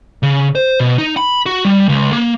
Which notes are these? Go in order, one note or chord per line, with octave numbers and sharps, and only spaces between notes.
C#3
C5
B2
D#4
B5
F#4
G3
C#2
A#3